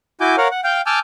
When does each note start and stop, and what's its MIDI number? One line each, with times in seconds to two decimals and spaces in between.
0.21 0.36 64
0.21 0.36 66
0.21 0.36 80
0.21 0.36 86
0.21 0.36 91
0.38 0.48 70
0.38 0.48 73
0.38 0.48 77
0.38 0.48 78
0.51 0.61 78
0.64 0.81 77
0.64 0.81 79
0.64 0.81 91
0.86 0.99 80
0.86 0.99 81
0.86 0.99 86
0.86 0.99 88
0.86 0.99 89
0.86 0.99 91